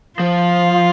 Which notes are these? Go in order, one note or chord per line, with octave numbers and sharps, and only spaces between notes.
F3 F4